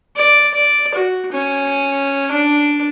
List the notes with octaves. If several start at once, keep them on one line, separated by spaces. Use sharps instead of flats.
D5
D5
F#4
C#4
D4